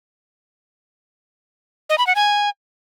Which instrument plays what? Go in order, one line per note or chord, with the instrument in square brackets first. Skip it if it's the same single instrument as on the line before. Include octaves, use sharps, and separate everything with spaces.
[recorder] D#5
B5
F#5
G#5